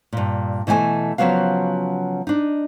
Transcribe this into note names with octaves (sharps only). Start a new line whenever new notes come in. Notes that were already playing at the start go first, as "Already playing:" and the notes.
G2 A#2
B2 E3 A3 E5 G#5
C#3 F3 F#3 B3 F#4 F5
D4 D#4